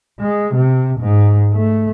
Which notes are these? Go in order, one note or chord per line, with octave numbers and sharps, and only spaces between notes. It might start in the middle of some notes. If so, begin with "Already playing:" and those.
G#3
C3
G#2
A3